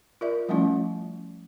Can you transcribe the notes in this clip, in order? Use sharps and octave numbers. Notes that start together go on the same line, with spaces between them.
F4 A#4 D5 E5
F3 G3 A3 C#4 E4 F4